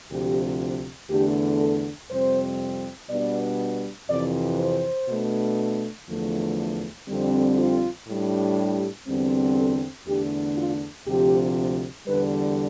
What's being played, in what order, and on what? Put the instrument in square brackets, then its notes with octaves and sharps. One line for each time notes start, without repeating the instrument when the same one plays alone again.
[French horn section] D2 C3 F3 G4
E2 D3 A3 D4 G4
A4
F2 C3 G3 C4 C5
B2 G3 B3 D4 D5
F2 C3 E3 D5
C5
B2 A3 D4
E2 D3 F3 A3
F2 D3 G3 C4
F4
A2 G3 D4
G4
E2 D3 G3 C4
A4
E2 D3 A3 D4 G4
F4
D2 C3 F3 G4
E2 D3 G3 B4